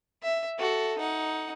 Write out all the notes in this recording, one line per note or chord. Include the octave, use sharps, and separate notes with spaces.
E5
F#4 A4
D#4 F#5